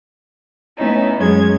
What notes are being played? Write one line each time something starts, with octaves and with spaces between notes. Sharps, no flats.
A3 B3 C#4 D#4 E4
F#2 F#3 G#3 C#4 G#6